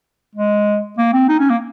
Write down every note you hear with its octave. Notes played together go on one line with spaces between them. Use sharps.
G#3
A#3
C4
D#4
C#4
A#3